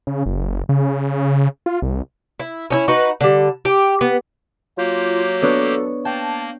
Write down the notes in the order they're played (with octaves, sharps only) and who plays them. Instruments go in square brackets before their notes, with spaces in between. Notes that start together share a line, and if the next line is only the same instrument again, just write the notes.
[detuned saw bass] C#3
F#1
C#3
F4
C2
[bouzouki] E4
C#4 D#4 E4
D#4 F#4 B4
D3 G3
G4
B3
[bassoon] F#3 [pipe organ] A#3 G4 G6 [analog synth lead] F4
[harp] B3 D4 C#5 [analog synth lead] A4
[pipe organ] A#3 [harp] G5 [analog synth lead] A5